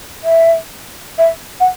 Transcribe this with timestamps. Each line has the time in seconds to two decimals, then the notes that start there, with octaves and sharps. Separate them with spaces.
0.24 E5
1.18 E5
1.60 F#5